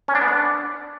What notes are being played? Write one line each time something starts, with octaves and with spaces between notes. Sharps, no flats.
C#4
D4
B3
D4